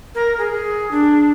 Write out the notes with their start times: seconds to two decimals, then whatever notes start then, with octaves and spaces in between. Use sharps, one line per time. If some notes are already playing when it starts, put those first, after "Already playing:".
0.15 A#4
0.38 G#4
0.91 D4